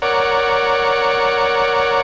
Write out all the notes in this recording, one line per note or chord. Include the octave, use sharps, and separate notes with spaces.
A#4 C#5 D5 F#5